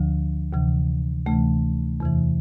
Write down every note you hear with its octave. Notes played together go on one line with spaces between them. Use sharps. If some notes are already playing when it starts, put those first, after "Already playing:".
Already playing: D2 D3 F3
D2 C3 E3
D2 C3 E3 A3
E2 C3 E3